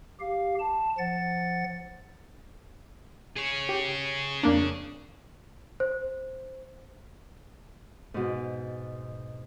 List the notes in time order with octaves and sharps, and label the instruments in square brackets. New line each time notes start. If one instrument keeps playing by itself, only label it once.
[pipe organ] G4 F5
A5
F3 F#5 A6
[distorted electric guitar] G#4 C#5
[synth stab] G4
F2 A#3 D4
[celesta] C5
[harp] G#2 B2